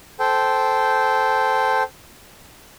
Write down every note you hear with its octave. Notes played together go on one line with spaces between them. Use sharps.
A4 C5 G5